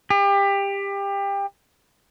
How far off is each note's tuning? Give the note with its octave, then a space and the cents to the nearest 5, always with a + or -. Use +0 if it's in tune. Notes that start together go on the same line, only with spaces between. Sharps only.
G4 +25